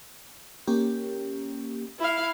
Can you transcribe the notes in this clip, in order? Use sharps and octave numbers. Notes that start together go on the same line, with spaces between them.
A#3 C#4 G4
E4 F5